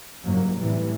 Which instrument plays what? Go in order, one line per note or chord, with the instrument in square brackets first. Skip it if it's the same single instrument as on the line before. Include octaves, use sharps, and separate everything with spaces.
[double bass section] F#1 C2 G#2 F#3 A#3
A2 C3 E3 G3